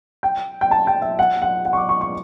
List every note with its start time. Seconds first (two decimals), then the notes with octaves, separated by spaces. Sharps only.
0.23 G5
0.61 G5
0.71 A5
0.87 G5
1.02 E5
1.19 F#5
1.42 F#5
1.65 F#5
1.73 C#6
1.77 D6
1.89 C#6
2.01 C#6